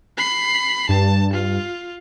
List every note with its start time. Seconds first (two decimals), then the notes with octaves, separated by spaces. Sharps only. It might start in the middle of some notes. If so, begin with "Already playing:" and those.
0.17 B5 C7
0.89 G2 A5
1.33 F4